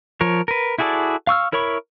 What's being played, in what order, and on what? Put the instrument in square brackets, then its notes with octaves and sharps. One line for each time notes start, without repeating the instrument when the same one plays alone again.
[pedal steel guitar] F3 A#4 C#5
A#4 B4
E4 F#4 G#4 A4 D5
F5 C#6 E6 F6
E4 A#4 C#5 B5 C#6